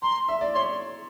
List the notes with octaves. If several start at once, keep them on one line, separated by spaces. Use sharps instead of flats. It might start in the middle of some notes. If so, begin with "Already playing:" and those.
A#5 C6
E5
D5
C#5 C6